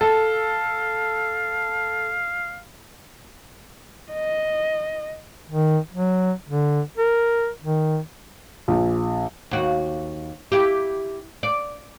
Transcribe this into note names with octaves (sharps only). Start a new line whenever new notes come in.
A4 F5
D#5
D#3
F#3
D3
A#4
D#3
A#1
D#2 F#4
E4 G4
D5